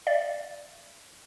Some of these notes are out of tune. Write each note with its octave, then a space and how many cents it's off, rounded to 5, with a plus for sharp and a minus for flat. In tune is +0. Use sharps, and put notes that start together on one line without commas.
D5 +0 F5 -40